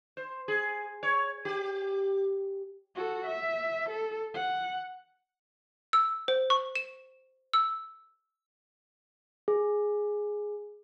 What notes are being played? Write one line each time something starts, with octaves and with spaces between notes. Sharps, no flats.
C5
G#4
C#5
G4
F#4 A4
E5
A4
F#5
E6
C5
C#6
E7
E6
G#4